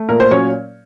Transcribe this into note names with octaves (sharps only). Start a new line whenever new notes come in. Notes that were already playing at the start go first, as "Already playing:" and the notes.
Already playing: A3
A#2 A#4
C5
F#3 C#4 C#5